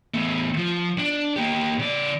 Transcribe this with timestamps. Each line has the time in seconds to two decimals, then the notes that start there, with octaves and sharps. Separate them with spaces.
0.14 E2 A3
0.57 F3
0.98 D4
1.36 A#3 G4
1.79 C#3 D5